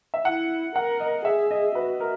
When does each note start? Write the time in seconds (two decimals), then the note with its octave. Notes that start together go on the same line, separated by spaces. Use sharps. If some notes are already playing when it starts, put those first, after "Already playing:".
0.14 E5
0.25 E4 F#5
0.76 A#4 F#5
1.00 D#5
1.25 G#4 E5
1.51 D#5
1.75 F#4 B4
2.00 A#4